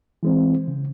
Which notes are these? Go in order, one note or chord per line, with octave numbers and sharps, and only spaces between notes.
E3 G#3 C4
C#3